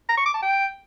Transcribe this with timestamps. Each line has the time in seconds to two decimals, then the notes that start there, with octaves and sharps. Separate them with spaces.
0.09 A#5
0.17 C#6
0.26 D6
0.34 A5
0.43 G5